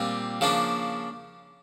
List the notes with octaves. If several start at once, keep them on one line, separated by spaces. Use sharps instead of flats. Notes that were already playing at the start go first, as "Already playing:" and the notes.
Already playing: A#2 G3 C4 F4
C#3 F3 A#3 D4